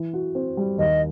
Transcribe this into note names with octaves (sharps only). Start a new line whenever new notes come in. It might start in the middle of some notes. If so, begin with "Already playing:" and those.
Already playing: E3
F#4
C4
G3
D#2 D#5